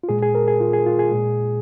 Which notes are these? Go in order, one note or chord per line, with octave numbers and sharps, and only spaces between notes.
F4
A#2 G#3 G#4
G#4
A#4
G#4
F4
G#4
F4
G#4
A#2 G#3